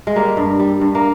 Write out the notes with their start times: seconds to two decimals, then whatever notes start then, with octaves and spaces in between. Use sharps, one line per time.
0.07 G#3
0.16 G3 A#3
0.37 G2
0.59 G3
0.81 G2
0.95 A#3